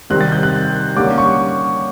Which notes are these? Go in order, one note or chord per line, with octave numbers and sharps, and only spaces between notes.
C3 D#3 G3 C4 F#6
A6
G6
F#6
D3 G3 A#3 C#4 D6
C#6